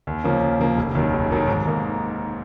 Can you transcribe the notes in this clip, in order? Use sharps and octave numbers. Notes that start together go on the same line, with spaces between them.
D#2
C#3 F3 A#3 C#4
D#2
C#3 F3 A#3 C#4
F1
D#2 D#3 F#3
F1
D#2 D#3 F#3
G#2
D#3 A#3